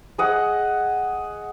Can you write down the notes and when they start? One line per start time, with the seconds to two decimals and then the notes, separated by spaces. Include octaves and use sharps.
0.18 G#4 D#5 F#5